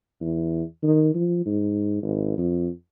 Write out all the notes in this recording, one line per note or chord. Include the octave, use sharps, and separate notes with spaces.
E2
D#3
F3
G#2
G#1
F2